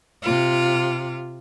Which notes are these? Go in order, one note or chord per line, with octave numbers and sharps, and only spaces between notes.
C3 F4